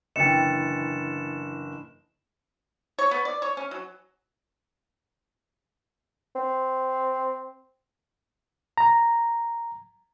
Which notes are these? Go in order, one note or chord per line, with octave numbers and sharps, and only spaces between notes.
F#1 D3 E3 D#5 G5 A6 C#7 E7
C#5
B3
D5
C#5
C#4
F#3
C4
A#5